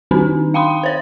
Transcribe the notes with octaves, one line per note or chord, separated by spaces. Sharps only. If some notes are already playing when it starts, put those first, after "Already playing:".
D#3 C4 D4 D#4
F5 G5 B5 C6 D#6
C5 C#5